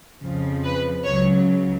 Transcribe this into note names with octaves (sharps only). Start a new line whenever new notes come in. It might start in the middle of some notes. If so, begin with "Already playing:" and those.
F2 C#3 F3
B4
C#2 C#3 F#3 C#5